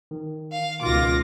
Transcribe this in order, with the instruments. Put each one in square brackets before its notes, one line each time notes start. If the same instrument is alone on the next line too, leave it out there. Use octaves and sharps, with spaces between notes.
[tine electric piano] D#3
[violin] F5
[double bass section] C#2 B2 [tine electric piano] D#3 [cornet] F4 [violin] D6 A#6